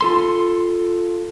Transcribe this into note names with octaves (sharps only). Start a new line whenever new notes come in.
F4 A4 C6